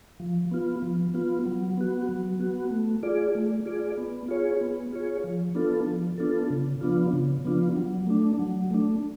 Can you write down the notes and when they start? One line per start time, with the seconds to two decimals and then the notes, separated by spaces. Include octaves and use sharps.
0.20 F3
0.51 B3 F4
0.82 F3
1.14 B3 F4
1.46 F#3
1.77 B3 F#4
2.09 F#3
2.39 B3 F#4
2.71 A3
3.03 F4 G#4 D5
3.35 A3
3.65 F4 G#4 D5
3.97 B3
4.28 F4 G#4 C#5
4.61 B3
4.93 F4 G#4 C#5
5.24 F3
5.55 B3 D4 F4 A4
5.86 F3
6.18 B3 D4 F4 A4
6.50 C#3
6.81 F3 B3 D4 F4
7.13 C#3
7.44 F3 B3 D4 F4
7.76 F#3
8.07 A3 D4
8.39 F#3
8.70 A3 D4